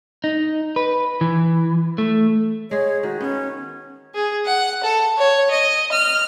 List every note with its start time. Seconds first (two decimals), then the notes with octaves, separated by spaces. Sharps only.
0.24 D#4
0.76 B4
1.21 E3
1.98 A3
2.71 G#3 G#4 C#5
3.03 D#3 F#4
3.21 B3 C#4
4.15 G#4
4.46 F#5
4.83 A4
5.17 C#5
5.50 D#5
5.92 F6